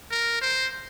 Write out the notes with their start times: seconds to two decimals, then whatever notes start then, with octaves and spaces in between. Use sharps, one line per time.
0.11 A#4
0.41 C5